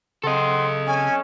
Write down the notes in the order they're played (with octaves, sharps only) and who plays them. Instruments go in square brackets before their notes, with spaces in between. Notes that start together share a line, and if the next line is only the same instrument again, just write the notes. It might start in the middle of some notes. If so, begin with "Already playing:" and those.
[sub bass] C#3 [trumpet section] C4 F#5 C6 [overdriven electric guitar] A4 D#5
[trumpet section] C#4 [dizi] G#5